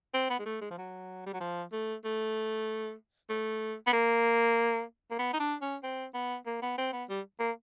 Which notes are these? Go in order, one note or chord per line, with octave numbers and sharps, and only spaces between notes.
C4
B3
G#3
A3
G#3
F3
F#3
G3
F#3
F3
A3
A3
A3
B3
A#3
A#3
B3
D#4
D4
C#4
C4
B3
A#3
B3
C4
B3
G3
A#3